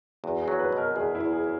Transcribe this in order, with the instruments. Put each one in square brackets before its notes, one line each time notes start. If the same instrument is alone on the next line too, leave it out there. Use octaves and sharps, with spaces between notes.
[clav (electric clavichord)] E2 [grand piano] F#4
[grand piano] G#4
[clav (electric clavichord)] F#3
[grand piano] B4
[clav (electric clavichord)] B2
[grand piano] A#4
[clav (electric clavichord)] E2 [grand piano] G#4
[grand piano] E4
[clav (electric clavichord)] E2
[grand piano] G#4
[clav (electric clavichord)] F#3